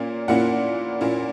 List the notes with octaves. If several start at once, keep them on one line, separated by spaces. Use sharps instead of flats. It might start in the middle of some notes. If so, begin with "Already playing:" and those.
Already playing: A#2 A#3 C#4
A#2 A#3 C#4 E4 F#5
A#2 A#3 C#4 E4